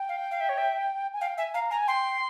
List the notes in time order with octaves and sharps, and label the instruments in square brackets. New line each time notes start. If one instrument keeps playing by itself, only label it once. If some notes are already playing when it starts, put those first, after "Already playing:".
Already playing: [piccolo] G5
[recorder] F5
F5
E5
C#5
E5
[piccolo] G#5
[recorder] F5 [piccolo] G5
[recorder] E5 [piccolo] G#5
[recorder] F5 [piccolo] A#5
[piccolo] G#5 [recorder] A#5
[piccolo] G5 [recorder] C6